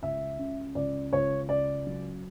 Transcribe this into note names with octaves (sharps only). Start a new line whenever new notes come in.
C#2 E5
C#3
C#2 D5
C#2 C#5
C#3 D5
F#3